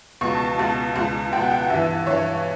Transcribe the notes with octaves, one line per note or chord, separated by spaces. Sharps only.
C#2 B2 C#6
A5
A5
C#2 B2 A5
C#2 B2
C#2 B2 G5
F#5
G5
F#5
G2 E3 E5
G2 E3 C#5